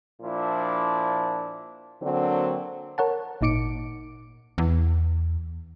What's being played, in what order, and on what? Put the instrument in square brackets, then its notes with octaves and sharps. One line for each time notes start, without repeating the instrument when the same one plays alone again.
[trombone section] A#2 F3 D4 E4
[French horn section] D3 F#3 A#3 C4 D4
[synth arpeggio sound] A#4 C#5 F#5 A5
G#1 A#2 D#4 D6 C#7 D7
[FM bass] E2